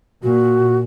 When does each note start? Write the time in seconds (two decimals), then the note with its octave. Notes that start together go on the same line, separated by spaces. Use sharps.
0.23 A#2 F#4